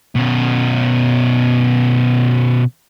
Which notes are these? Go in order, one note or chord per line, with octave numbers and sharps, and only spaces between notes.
B2 C#4